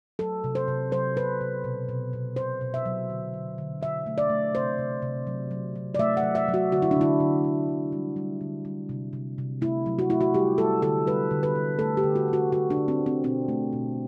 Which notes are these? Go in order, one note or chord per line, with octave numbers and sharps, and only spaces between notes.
F#3 A4
C3
C5
C3
F#3 C5
C3 B4
C3
B2
B2
B2
B2 C5
B2
E5
F#3
D3
D3
D3
D3 E5
A3
D5
A3
C3 C5
C3
C3
F#3
F#3
F#3
D5
A3 E5
F#5
F#3
E5
F#3
F#4
D3 F#4
E4
D4
D3 E4
D3
D3
D3
G3
G3
D3
G3
C3
C3
C3
A3 E4
F#3
F#4
A3 E4
F#4
G3 G4
G3 A4
D3 A4
G3 B4
D3
B4
G3
A3 A4
G4
D3
F#4
D3 F#4
D3 F#4
D4
D3
C4
D3
C4
B2 C4
A3
B2